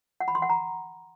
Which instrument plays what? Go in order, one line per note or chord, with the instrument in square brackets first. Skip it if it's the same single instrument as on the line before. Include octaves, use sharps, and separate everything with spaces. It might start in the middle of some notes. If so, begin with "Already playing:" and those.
[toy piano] F#5
B5
C6
F#5
A#5